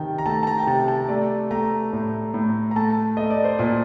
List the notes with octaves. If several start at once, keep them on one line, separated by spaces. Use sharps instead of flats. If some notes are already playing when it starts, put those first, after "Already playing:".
Already playing: C3 D#3 G5 A5
A#5
A3 A5
A5
A#5
G5
C3 A5
A5
A3 D5
A3 A#5
A2
A2
A#5
A3 A5
A3 D#5
D5
C5
A#2 D5